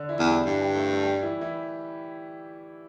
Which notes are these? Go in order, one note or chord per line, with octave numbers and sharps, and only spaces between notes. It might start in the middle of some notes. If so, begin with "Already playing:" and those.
Already playing: D3 D4
E3 E4
E2
G3 G4
G2 G3 G4
G3 G4
A3 A4
A3 A4
G3 G4
E3 E4
E3 E4